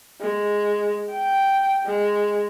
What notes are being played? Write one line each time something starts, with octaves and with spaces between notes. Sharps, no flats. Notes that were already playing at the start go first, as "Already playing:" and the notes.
G#3
G5
G#3